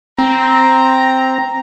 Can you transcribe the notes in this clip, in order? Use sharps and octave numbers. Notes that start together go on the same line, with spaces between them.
C4 A#5